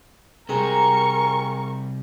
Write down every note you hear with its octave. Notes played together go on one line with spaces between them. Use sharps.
C3 G3 G#3 A#4 G5 G#5 A#5 C#6